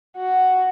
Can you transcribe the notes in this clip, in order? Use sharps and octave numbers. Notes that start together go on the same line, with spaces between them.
F#4